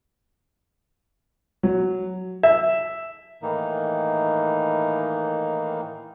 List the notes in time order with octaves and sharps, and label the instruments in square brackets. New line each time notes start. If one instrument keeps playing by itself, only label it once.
[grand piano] F#3
[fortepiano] E5
[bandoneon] A2 D#3 E3 A#3 D#4